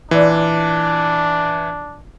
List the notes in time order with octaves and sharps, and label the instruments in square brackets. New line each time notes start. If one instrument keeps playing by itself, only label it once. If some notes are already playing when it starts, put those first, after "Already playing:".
[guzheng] A#2 F4 [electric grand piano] E3 [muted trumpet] D4